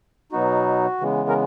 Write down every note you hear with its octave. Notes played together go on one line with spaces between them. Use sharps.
B2 F#3 B3 D#4 F#4
C#3 E3 G#3 B3
A#4